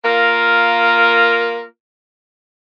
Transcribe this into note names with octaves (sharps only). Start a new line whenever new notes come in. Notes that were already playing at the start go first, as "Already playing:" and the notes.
A#3 F4 A#4